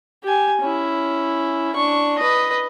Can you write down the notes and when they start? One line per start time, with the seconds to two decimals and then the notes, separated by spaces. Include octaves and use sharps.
0.24 G4 G#5
0.62 C#4 E4
1.75 D4 C#6
2.18 B4 D#5